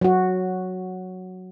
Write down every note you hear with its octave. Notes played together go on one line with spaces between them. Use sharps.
F#3 F#4